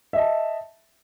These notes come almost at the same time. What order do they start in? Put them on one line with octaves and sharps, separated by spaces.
E5 D#5 A5